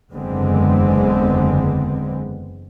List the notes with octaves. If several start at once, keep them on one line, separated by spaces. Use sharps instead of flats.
F#1 E2 D3 G#3 B3 C4